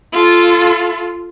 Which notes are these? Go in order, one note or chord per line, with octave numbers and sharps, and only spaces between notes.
F4 A4